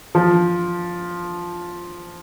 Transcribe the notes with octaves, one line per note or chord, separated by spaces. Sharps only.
F3